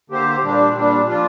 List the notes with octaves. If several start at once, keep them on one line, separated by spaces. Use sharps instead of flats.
D3 A#3 G4 C5
A#2 G3 D4
A#2 G3 D4
F3 D4 F4